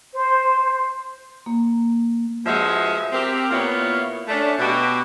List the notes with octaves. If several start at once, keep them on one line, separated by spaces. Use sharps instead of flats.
C5
A#3
G2 F3 G#3 F#4 E5
C4 G4 A#4
A#2 A#3 B3 E4 F4 C#5
A3 C#4 D4
B2 F#4 G4